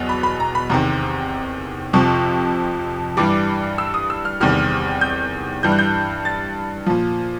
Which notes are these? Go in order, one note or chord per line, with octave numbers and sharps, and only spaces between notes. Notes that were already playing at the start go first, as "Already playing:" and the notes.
Already playing: E2 B2 F#3
B5
B5
A#5
B5
E2 C3 D#3 A#5
F2 C3 F3 C#6
G2 E3 G3 D6
E6
D#6
E6
F6
E2 C3 D#3 G3 F6
G6
G2 E3 G3 G6
F#6
G6
A6
A#2 F3